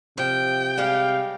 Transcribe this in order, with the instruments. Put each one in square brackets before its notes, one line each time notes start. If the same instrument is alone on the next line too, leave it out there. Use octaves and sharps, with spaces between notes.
[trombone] C3 [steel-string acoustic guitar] F3 [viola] G5
[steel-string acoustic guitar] G3 G#3 G4 [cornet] F5